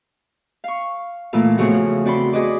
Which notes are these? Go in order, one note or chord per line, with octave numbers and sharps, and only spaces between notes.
F5 C#6
A#2 E3 A3 A#3 F4 A4
E2 C#3 F3 A3 F#4 F#5
C4 F#4 D5 B5 C6
F#4 G#4 B4 D#5 D6